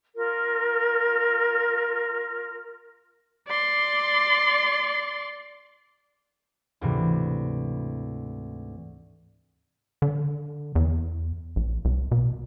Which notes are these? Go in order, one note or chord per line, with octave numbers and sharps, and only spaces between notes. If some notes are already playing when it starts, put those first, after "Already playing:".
F4 A#4
D5 C6
D2 G#2 C3 E3
D3
E2
A#1
C2
B2